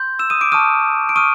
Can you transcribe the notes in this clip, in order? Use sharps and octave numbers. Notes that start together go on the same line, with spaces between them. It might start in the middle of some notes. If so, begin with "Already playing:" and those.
Already playing: C6 G6
E6 E7
D#6 D#7
D6 D7
A5 C#6 D#6 F6 D#7
D7
C#6 D#6 F6 D#7